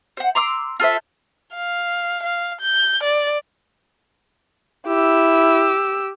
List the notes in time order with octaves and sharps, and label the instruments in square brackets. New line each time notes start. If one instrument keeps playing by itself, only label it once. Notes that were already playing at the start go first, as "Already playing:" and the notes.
[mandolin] C5 F#5
A#5 C6 D6 E6
F4 A4 C5 E5
[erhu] F5
F5
G6
D5
[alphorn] E4 [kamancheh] G4 E6